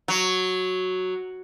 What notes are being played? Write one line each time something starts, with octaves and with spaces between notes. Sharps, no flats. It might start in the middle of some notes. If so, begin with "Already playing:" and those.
F#3